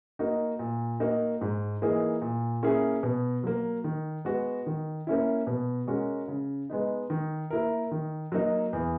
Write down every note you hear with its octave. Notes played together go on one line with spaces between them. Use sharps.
A#3 D#4 F#4
A#2
A#3 D#4 F#4
G#2
E3 A#3 D#4 G#4
A#2
A#3 C#4 E4 G#4
B2
F#3 A#3
D#3
G#3 B3 F#4
D#3
A#3 C#4 E4
B2
G#3 C#4 F#4 A#4
C#3
G#3 B3 D#4
D#3
A#3 E4 A#4
D#3
F#3 A#3 D#4
E2